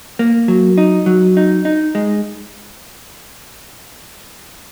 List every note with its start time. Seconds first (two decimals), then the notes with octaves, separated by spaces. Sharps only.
0.19 A#3
0.48 F#3
0.78 D#4
1.06 F#3
1.37 D#4
1.65 D#4
1.95 G#3